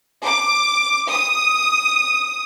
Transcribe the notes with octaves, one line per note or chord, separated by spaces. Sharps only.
D6
D#6